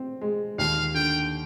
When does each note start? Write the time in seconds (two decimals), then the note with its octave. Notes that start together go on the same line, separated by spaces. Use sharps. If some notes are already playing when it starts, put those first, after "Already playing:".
Already playing: C4
0.21 G#3
0.58 D#2 F5
0.94 D3 G5